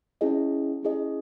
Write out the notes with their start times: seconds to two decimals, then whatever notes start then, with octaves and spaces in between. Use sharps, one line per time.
0.21 C#4 E4 G#4 D#5
0.83 C#4 E4 G#4 D#5